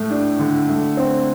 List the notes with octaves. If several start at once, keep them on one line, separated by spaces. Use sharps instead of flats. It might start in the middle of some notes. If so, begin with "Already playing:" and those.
Already playing: A2 A3
D4
D3
A3
C4